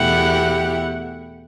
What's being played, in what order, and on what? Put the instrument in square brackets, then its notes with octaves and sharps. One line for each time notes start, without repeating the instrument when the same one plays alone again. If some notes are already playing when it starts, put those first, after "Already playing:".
Already playing: [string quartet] E2 B2 A3 E4 G4 [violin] F#5